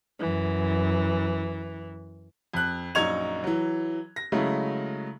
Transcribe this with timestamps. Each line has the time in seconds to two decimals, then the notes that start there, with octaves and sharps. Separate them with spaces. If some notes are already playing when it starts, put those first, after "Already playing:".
0.20 F#2 E3
2.53 F2 F#6
2.95 A#1 F#2 D#4 C#6 G#6 F7
3.44 E3 F#3
4.16 A#6
4.32 C#3 F#3 G#3 A3 E4